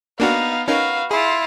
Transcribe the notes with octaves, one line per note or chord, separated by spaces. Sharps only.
A#3 B3 D4 D#4 F#4 F5
C#4 D#4 F#4 A#4 B4 F5
E4 F4 G#4 C6